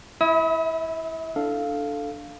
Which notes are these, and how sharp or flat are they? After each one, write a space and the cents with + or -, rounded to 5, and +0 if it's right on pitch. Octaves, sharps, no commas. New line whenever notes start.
E4 +0 E5 -35 D#6 +45
D4 +0 A4 +0 F5 +0